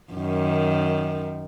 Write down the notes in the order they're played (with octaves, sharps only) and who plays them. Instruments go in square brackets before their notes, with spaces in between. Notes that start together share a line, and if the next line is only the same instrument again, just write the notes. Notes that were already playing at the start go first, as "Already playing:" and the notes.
[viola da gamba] F#2 D#3